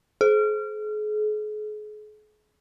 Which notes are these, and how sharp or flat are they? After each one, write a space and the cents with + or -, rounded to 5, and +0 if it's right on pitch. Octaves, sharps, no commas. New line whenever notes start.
G#4 +40